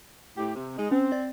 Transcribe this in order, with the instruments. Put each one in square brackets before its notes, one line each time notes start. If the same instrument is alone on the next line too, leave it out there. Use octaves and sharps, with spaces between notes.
[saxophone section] A2 G4
C3
G#3 D#4
[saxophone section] C4 [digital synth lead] C#4
[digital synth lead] D5